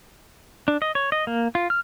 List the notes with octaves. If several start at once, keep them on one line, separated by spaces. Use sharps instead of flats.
D4
D#5
C#5
D#5
A#3
F4
F6